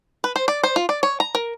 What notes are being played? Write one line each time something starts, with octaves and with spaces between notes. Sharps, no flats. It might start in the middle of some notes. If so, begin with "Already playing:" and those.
B4
C5
D5
C5
F4
D5
C#5
A#5
A#4